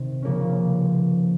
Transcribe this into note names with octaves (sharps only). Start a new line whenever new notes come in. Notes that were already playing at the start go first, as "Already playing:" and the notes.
Already playing: C3 D#3
C#3 F3 A#3 C#4